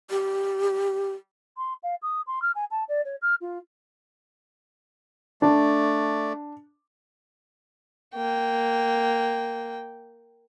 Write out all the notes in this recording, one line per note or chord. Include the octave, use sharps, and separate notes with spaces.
G4
C6
F5
D#6
C6
F6
G#5
A5
D5
C#5
F6
F4
A3 D4 D5
A#3 G5